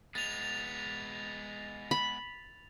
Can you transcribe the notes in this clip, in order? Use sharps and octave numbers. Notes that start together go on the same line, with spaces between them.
G#3 B3 A6 F7
B5